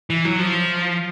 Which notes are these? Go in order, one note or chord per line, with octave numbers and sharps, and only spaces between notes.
E3
F#3
F3